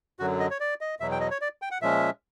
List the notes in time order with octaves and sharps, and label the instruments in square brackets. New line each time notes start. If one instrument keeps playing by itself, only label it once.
[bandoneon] F#2 D3 F#3 F#4
D#5
C#5
D5
D#5
E2 B2 F#3 E5
G5
D#5
C#5
D5
G5
F#5
A#2 F3 G#3 C#4 E5